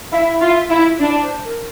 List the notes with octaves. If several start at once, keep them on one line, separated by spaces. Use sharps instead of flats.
E4 E5 F5
F4
E4
D4 D5
C5
A#4